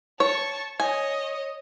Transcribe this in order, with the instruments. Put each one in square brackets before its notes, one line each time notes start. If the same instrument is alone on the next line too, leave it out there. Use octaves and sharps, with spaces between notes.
[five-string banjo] C#5 [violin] A5 C#6
[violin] C#5 D#5 [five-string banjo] G#5